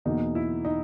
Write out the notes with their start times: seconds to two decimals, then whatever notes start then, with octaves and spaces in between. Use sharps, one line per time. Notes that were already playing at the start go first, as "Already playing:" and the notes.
0.05 E2 B2 A#3 D#4
0.35 E4
0.65 D#4